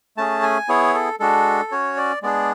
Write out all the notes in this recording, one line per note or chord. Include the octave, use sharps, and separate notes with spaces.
A3 C#4 G#4 A5
G#5
B3 E4 G#4 C#5
A4
G#3 D4 F#4 A4
C#4 F#4 C#5
D5
G#3 B3 D4 G#4 D5